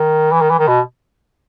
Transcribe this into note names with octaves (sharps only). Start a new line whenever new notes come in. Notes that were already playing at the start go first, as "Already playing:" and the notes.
Already playing: D#3
E3
D#3
E3
D#3
B2